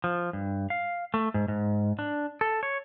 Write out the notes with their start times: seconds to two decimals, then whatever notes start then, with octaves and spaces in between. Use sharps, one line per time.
0.04 F3
0.33 G2
0.70 F5
1.14 A3
1.34 G#2
1.48 G#2
1.99 D4
2.41 A4
2.63 C#5